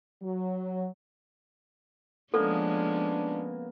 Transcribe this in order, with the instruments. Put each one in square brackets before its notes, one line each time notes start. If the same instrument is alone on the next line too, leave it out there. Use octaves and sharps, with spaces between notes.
[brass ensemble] F#3
[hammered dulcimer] C#3 A#3 B3 [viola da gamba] F3 G#3 C#4 [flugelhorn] D4 [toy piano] A4